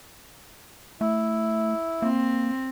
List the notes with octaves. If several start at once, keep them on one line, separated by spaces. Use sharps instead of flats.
A3 E4
A#3 C4